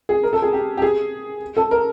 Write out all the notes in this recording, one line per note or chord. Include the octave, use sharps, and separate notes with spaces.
G#4
A#4
A4
G#4
G4
G4
G#4
A4
A#4